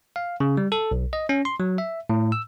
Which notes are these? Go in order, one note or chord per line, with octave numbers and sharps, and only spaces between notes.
F5
C#3
G3
A4
B1
D#5
C#4
C6
F#3
E5
A2
E6